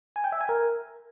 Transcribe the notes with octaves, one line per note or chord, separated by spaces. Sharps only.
G#5
G5
E5
G#5
A#4